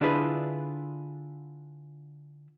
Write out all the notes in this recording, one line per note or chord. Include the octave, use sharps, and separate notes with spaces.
D3 D4 E4 F4 G#4 B4